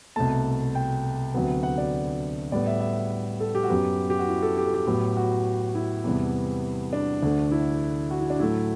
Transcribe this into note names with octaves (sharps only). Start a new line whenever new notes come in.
C2 B2 A3 A5
G5
D2 C3 F#3 B3
F#5
D5
A2 G3 B3 D5
E5
E5
A4
G4
F#4
F#2 F#3 B3 G4
G4
F#4
E4
A4
G4
A4
G4
A2 F#3 B3
F#4
E4
E2 C3 E3 G3 B3
D4
D2 D3 A3
E4
F#4
E4
D4
A2 F#3 A3 E4